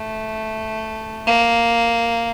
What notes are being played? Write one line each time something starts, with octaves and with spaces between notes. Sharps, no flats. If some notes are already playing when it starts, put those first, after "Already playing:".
Already playing: A3
A#3